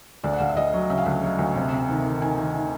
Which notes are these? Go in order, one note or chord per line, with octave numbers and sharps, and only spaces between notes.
D2 D5
F#5
D2 F5
E5
D2 D#5
F#3
C#3 E5
F5
D2 E5
F#3
D2
C3
C3
D#3
D#3
D#3 G#5
D#3
D#3